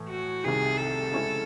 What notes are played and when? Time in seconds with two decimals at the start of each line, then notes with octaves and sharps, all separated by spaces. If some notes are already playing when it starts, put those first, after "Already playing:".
Already playing: A2 E3 A3
0.09 F#4
0.44 C2 C3 D#3 G#4
0.78 A4
1.11 C#3 G#3 C#4 E4